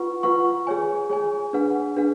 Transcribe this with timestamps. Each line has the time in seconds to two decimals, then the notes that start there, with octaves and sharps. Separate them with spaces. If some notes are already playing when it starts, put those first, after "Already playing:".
Already playing: F4 B4 F#5 C#6
0.23 F4 B4 F#5 C#6
0.67 G#4 C#5 G#5
1.10 G#4 C#5 G#5
1.53 D4 G#4 B4 F#5
1.96 D4 G#4 B4 F#5